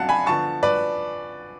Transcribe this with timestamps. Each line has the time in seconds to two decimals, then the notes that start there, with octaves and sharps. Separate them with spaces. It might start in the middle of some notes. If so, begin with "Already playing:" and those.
Already playing: F2 D3 F#3 C#4 F4 F5 F#5 A5
0.09 G#5 B5
0.26 D3 F3 B3 A5 C#6
0.63 B4 D5